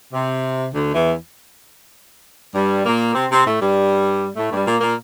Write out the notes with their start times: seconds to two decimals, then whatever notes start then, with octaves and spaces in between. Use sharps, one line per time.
0.13 C3
0.74 D2 D3
0.95 E2 E3
2.55 G2 G3
2.86 A#2 A#3
3.15 C3 C4
3.30 C3 C4
3.46 A2 A3
3.60 G2 G3
4.36 A2 A3
4.52 G2 G3
4.66 A#2 A#3
4.81 A#2 A#3